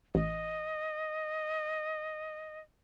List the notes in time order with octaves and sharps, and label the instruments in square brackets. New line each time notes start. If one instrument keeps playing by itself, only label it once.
[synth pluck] A1 [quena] D#5